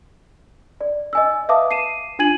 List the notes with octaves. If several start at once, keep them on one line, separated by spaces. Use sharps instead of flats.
D5
D#5 G#5 E6
B4 E5 F5 A5 D6 D#6
C7 D#7 E7
D4 F4 G#5 G#6 D#7 F#7